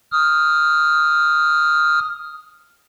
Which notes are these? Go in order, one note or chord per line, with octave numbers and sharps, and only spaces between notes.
D#6 F6